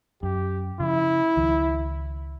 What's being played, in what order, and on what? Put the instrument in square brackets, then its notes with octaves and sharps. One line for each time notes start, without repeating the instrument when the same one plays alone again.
[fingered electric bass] F#2 [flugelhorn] G4
[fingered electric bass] C#3 F3 [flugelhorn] E4
[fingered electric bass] C#2 D#3 F3